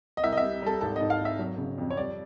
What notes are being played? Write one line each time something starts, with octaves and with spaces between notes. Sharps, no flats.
D#5
C2 E5
D#5
E5
G3
G3 A4
G#1 A4
D#5
G#2
F5
G#1 E5
F#3
C#3
F2
C#5
G3 D5